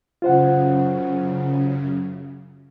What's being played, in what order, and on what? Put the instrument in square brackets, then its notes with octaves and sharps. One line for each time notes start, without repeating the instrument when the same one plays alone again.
[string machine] F#2 C#3 [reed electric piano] F4 C5 F#5